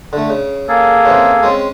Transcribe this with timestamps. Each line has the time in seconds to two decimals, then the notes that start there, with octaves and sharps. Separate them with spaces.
0.13 D3 A3
0.30 C#3
0.68 A#3 G#4 A4
1.05 C#3 E3 C4
1.43 G#3 C4 C#4